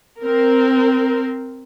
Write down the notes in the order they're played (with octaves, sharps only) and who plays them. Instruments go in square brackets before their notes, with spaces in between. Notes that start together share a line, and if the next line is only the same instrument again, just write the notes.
[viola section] C4 A#4